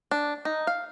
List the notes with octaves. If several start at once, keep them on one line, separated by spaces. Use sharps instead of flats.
D4
D#4
F5